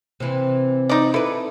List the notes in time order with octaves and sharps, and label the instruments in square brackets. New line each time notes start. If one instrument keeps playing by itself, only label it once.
[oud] C3 E3
[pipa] D#4 D5
[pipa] E4 [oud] A4 B4